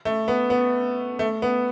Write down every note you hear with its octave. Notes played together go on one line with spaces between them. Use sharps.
A3
B3
B3
A3
B3